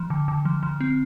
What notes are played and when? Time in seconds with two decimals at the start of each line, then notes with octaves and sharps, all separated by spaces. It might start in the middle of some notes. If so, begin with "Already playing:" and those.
Already playing: F3
0.10 D3
0.28 D3
0.45 F3
0.63 F3
0.81 C4